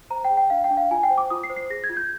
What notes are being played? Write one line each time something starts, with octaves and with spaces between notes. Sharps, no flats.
C5 A#5
G5
G#4
G5
D4 F5
G5
D4
F5
F4 G#5
G5
C5
D6
F4 D#6
C7
C5
C7
G#4 A#6
G#6
F4
G6